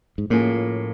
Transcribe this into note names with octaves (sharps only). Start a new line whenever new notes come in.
G#2
A2 F3 A#3 C#4 F4 G#4